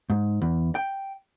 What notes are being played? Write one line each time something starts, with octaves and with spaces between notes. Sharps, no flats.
G#2
E2
G5